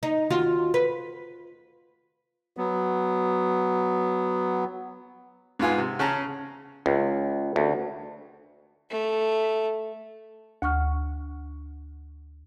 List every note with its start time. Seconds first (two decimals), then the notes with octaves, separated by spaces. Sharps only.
0.03 D#4
0.30 D#2 F4 F#4
0.74 B4
2.57 F#3 B3
5.59 G#2 B3 F4 G#5
5.78 C3
5.99 C#3 C#4 A5 A#5
6.86 C#2
7.56 D2
8.90 A3
10.62 D2 F#5 C#6 F6